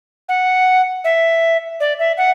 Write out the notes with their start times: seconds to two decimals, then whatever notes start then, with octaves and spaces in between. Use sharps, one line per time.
0.29 F#5
1.04 E5
1.80 D5
1.99 E5
2.18 F#5